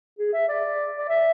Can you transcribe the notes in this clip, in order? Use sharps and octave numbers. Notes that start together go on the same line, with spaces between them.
G#4
E5
D5
D5
E5